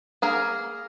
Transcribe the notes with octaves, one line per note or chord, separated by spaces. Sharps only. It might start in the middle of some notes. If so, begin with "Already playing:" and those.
A#3 G#4 A#4